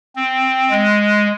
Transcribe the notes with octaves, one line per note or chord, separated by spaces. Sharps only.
C4
G#3